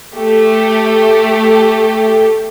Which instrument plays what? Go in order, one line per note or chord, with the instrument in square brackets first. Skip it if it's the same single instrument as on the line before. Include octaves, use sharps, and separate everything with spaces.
[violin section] A3 G4 A4